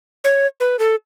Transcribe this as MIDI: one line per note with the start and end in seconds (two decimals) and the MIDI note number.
0.24 0.46 73
0.60 0.76 71
0.79 0.95 69